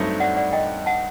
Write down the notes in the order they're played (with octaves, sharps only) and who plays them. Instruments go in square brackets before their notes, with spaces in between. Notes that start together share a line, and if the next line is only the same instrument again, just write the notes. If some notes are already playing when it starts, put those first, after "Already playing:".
Already playing: [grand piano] G2 F#3 A3 C4 D#4
[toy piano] D5 F#5
D5 F#5
D#5 G5
F#5 A5